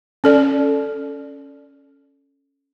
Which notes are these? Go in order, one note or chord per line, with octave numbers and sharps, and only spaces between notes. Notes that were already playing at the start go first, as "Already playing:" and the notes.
C#4 A4 D5